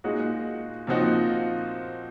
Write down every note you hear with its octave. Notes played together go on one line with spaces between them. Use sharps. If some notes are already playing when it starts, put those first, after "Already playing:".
A#2 G#3 D#4 F#4
A#2 F3 C4 D#4 F#4